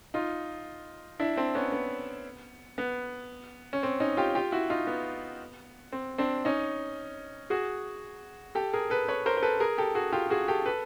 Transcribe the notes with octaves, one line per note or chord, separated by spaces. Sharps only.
D#4 F4
D4 E4
C4 D4
B3 C#4
B3
B3
C#4
C4
C#4 D#4
F4 G4
F4 G4
E4 F#4
D#4 F4
B3
C4
C4 D4
C#4 D#4
F#4 G#4
G4 A4
G#4 A#4
A4 B4
B4 C#5
A#4 C5
C5
A4 B4
G#4 A#4
G4 A4
F#4 G#4
F4 G4
F#4 G#4
G4 A4
A4 B4